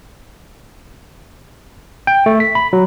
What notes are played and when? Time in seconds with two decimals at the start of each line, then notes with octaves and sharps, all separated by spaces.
2.07 G5
2.26 A3
2.40 B6
2.55 B5
2.73 F#3